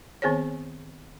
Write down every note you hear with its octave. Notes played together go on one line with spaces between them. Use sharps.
D#3 B3 C4 G#4 C5 C#5